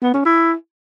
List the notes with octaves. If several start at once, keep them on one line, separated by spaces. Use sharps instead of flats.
B3
C#4
E4